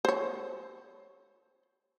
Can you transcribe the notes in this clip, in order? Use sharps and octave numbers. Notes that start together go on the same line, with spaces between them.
C5 C#5